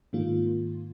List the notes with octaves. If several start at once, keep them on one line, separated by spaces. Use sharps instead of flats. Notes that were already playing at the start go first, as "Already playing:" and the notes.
G#2 D#3 A#3 F4